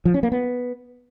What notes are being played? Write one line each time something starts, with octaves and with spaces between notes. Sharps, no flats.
F3
C#4
A#3
B3